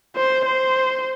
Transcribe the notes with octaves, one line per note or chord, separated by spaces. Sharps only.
C5
C5